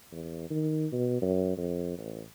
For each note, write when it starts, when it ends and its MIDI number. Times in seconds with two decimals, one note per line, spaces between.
0.12 0.47 40
0.50 0.87 51
0.92 1.19 47
1.22 1.55 42
1.57 1.97 41
1.98 2.22 33